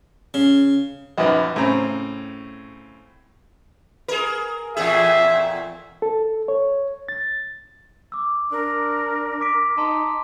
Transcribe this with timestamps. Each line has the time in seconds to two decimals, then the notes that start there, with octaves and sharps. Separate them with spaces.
0.34 C#3
1.18 A#1 F#2 D#4 B4
1.56 A2 C#3 C4 A#5
4.08 G#4 A#4
4.77 E2 A#2 G#4 E5
6.02 A4
6.48 C#5
7.09 A6
8.12 D6 E6
8.52 D4 A#4
9.41 D6 B6 D7
9.78 D#4 A5 A#5 C6